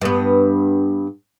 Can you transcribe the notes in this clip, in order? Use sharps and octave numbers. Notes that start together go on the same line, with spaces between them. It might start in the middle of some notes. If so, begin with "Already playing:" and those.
G2 B3